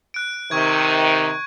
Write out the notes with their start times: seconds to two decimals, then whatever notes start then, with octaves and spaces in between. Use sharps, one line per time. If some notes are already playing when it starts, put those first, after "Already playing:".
0.14 F#6 D7
0.51 C3 D#3 C#6 G#6